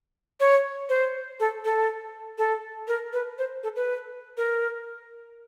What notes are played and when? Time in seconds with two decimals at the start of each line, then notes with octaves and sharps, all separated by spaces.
0.40 C#5
0.89 C5
1.40 A4
1.65 A4
2.38 A4
2.88 A#4
3.13 B4
3.38 C5
3.63 A4
3.76 B4
4.37 A#4